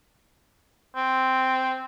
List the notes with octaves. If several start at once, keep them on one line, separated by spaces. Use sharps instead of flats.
C4